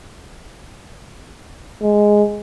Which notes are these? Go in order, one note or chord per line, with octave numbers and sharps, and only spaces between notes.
G#3